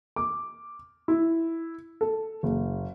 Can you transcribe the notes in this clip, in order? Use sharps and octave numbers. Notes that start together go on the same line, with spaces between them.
D6
E4
A4
F#1